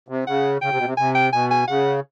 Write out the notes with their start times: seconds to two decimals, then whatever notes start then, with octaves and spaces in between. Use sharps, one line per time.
0.08 C3
0.27 C#3 F#5
0.62 C#3 G5
0.70 C3
0.78 B2
0.85 C3
0.97 C3 G#5
1.15 G5
1.32 B2 G#5
1.51 G#5
1.68 C#3 F#5